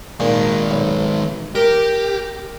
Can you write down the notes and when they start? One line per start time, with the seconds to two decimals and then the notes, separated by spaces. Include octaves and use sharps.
0.20 A#2 D#3 G#3
0.71 B1
1.55 G4 A#4